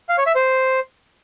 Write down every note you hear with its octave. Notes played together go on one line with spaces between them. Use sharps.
F5
C#5
E5
C5